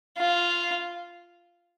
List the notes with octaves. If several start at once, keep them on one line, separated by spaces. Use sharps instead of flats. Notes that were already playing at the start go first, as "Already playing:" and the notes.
F4